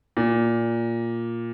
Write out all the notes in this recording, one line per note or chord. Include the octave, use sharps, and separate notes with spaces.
A#2